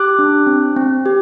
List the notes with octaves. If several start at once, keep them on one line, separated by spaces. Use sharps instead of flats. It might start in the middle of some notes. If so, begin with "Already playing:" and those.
Already playing: G4 D6 F#6
D4
C4
C4
G4